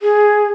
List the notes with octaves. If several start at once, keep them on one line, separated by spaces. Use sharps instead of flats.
G#4